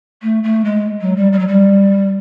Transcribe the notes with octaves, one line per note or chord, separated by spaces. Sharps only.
A3
A3
G#3
F#3
G3
G3
F#3
G3